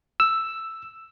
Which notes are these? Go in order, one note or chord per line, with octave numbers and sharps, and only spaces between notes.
E6